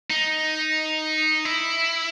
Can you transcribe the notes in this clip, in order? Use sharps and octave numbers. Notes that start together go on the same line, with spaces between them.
D#4
E4